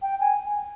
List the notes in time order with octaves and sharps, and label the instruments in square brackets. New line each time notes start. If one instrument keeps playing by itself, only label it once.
[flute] G5
G#5